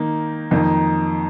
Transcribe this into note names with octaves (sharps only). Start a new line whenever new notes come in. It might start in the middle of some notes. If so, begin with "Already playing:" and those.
Already playing: D#3 A#3 D#4
F2 D#3 A#3 D#4